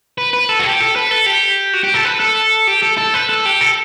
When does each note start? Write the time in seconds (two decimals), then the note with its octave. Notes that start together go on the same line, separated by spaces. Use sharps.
0.18 B4
0.33 B4
0.49 A4
0.59 F#4
0.64 G4
0.80 A4
0.96 B4
1.11 A4
1.26 G4
1.73 F#4
1.84 G4
1.94 A4
2.05 B4
2.20 A4
2.67 G4
2.83 A4
2.98 A4
3.14 B4
3.29 A4
3.46 G4
3.61 A4